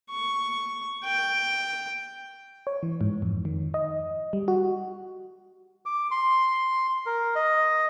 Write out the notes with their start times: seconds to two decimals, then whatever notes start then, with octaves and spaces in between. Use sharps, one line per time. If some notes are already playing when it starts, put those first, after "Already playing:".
0.11 C#6
1.05 G5
2.67 C#5
2.83 E3
3.01 G#2
3.22 F2
3.45 D#3
3.74 D#5
4.33 G3
4.48 F#4
5.86 D6
6.11 C6
7.06 A#4
7.35 D#5